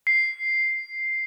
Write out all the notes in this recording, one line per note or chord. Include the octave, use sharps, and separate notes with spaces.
C7